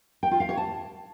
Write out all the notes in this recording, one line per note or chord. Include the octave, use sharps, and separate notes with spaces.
G5
F4
F5
C#5
A5